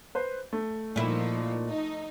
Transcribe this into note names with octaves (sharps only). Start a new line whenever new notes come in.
B4 C5
A3
A#2 F3 D#4 E4
D#4